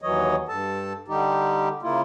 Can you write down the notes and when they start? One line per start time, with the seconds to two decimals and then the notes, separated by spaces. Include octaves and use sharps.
0.02 D#2 E3 F#3 C#5 D#5
0.49 G2 A4 A5
1.08 D3 G3 D#4 G4
1.82 C#3 A#3 E4 F4